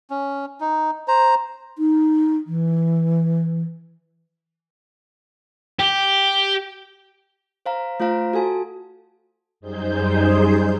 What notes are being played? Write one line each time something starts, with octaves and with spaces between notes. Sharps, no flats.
C#4
D#4
C5 A#5
D#4
E3
G4
C5 F5 A#5
A3 F4 C5 F5 A#5
F#4 A4 G#5 A5
F#2 G3 D#4 G#4 C5 G6